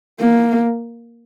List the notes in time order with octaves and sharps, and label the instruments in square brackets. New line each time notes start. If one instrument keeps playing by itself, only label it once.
[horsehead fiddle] A#3